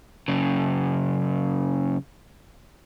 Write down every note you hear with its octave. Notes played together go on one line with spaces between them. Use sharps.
F#2 C#3